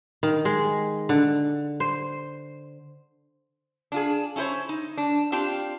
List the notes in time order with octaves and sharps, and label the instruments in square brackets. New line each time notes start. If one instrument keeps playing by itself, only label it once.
[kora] D#3
G#3
D3
C5
[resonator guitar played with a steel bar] D4 F4 G#4
C#4 E4 G4 C5 C#5
D#4
D4
C4 D4 F4 G4